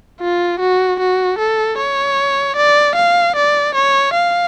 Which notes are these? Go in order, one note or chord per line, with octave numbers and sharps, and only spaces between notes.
F4
F#4
F#4
A4
C#5
D5
F5
D5
C#5
F5